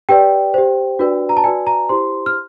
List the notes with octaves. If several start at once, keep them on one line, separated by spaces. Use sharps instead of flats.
G4 B4 D5 G5
G4 C5
D4 F#4 B4 D5
A#5
A5
F#4 B4 D5 G#5
A#5
E4 G4 C5 C6
F6